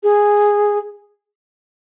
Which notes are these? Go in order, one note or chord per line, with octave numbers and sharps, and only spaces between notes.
G#4